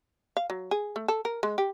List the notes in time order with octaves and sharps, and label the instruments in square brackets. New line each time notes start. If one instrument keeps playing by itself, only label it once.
[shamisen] F5
F#3
G#4
A3
A4
A#4
G#3
G4